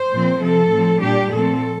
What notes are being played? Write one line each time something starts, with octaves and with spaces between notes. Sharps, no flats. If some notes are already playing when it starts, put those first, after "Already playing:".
Already playing: C5
A#2 F3 C4
C3 F3 C4 A4
A2 F3 C4
A#2 G3 D4 G4
A#2 F3 A3 C4 A4